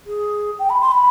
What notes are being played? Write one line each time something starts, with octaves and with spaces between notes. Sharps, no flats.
G#4
G5
B5
C6
B5